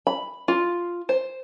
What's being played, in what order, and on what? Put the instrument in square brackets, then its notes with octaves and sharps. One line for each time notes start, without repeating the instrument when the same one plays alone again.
[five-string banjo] B5
F4
C5